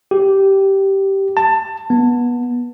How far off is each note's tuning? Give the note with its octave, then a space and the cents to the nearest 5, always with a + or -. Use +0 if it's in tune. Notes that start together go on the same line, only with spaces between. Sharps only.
G4 -10
A5 +20
B3 -25